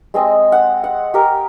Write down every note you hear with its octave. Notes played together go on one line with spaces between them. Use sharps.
G#3 C4 D#5
F#5
F#5
G4 A#4